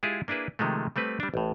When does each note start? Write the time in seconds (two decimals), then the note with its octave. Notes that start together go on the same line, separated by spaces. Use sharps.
0.03 G#3 E4 F4 G4 G#4
0.28 A#3 D4 E4 G#4 B4
0.59 C3 D#3 F3 G#3 A3
0.96 G3 A3 C4 B4
1.20 G3 D4
1.34 A1 A2